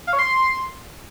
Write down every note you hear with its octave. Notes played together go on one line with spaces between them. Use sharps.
F5
C#5
C6